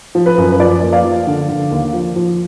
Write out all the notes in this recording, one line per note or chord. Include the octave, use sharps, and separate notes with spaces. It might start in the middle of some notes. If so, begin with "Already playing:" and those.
F3
B4
F#2
B4
F3 D5
A#3
D5 F5
F3
D3
D3
D#2
F3
F3